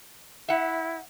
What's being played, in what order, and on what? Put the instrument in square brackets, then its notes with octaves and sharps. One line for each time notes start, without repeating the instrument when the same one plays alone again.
[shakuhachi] E4 [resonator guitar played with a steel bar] E5 F#5